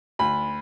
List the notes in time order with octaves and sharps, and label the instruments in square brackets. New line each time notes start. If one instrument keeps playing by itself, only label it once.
[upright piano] D2 B5